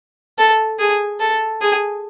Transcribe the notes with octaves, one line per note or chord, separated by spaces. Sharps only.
A4
G#4
A4
G#4